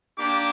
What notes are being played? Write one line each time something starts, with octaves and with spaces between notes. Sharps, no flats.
A#3 D4 G4 D6